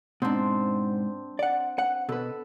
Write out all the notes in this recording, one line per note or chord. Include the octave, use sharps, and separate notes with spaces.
G#2 B2 C4 D4
D5 F#5
F#5
B2 A4 B4